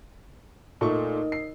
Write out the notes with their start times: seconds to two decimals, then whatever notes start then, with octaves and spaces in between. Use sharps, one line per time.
0.81 A#2 A3 D#4 A#4 D#5 C#6
1.32 C7